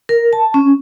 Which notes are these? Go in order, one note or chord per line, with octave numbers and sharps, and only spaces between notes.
A#4
A5
C#4